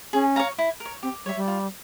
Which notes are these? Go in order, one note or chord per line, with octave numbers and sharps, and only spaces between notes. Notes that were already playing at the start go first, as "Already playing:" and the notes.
C#4 G#4
C#5 F5 A#5
E4
A#4
C#5
C4 G4
G3 C#5 E5
G3
F4